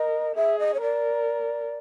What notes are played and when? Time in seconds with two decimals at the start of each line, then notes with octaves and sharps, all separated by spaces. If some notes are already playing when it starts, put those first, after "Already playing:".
Already playing: A#4 D#5
0.36 G#4 E5
0.59 D#5
0.74 C#5
0.81 A#4 D5